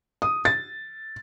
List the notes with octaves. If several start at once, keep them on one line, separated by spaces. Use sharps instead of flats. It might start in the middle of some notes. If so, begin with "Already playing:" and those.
D#6
A6